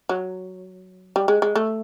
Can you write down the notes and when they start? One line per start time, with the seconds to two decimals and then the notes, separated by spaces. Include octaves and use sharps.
0.09 F#3
1.16 G3
1.28 G#3
1.42 G#3
1.56 A3